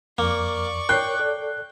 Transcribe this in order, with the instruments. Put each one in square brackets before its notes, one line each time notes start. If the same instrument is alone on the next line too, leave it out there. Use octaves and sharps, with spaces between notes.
[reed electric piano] F2 [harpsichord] A#3 [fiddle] D5 C#6
[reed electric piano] A#4 C#5 [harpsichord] G5 [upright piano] F#6 C7
[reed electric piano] A4 D5